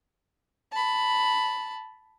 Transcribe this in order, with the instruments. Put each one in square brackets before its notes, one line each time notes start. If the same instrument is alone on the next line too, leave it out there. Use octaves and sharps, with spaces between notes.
[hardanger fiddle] A5 B5